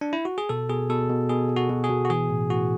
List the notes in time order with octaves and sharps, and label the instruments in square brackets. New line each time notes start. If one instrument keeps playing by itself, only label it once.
[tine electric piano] D4
E4
F#4
G#4
B2 A4
B2 G#4
B2 A4
B2
B2 G#4
B2
F#4
B2
G#4
B2
F#4
E3 G#4
A2
A2 F#4